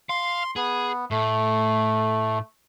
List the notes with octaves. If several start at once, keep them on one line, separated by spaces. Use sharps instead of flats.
F5 C6
B3 G#4
A2 A3